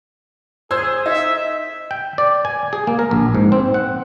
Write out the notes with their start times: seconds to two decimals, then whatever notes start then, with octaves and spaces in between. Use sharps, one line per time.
0.71 G#4 C5 E6 G#6
1.06 D#4 E5
1.91 G5
2.18 D5
2.45 G#5
2.73 G#4
2.87 A#3
2.99 A#4
3.11 A#1
3.34 G#2
3.52 C4
3.74 F#5